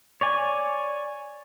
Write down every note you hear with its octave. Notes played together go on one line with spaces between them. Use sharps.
C#5 D5 G#5